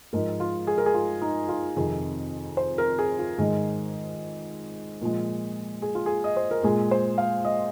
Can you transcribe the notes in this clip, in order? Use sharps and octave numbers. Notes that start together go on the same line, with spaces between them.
G#2 F3 G#3 A#4
F4
G#4
A#4
G#4
F4
D#4
F4
F2 C3 D#3 G#4
C5
A#4
G#4
F4
G#2 D#3 G#3 G#4
A#2 F3 G#3
G#4
F4
G#4
D#5
C5
A#4
A#2 G#3 G#4
C5
F5
D#5